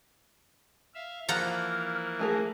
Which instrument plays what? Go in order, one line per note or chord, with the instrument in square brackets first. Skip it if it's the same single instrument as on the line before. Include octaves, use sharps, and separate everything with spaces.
[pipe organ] E5 F5
[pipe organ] E3 A#3 [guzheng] F3 F#5 A#5 [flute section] F6
[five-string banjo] A3 G#4 A#4